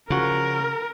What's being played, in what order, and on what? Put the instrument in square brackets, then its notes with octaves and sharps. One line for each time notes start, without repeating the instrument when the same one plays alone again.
[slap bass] C#3 [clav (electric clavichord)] F3 F#4 [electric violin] A#4